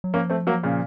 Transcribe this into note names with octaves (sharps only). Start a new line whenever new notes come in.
F#3
F3 A#3 C#4
A3 C4
F#3 A#3
A#2 C#3